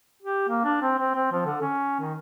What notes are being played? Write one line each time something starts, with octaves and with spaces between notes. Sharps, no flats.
G4
A#3
D4
C4
C4
C4
F3
D3
C#4
D#3